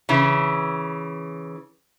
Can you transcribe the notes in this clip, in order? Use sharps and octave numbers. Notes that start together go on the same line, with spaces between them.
C#3 E3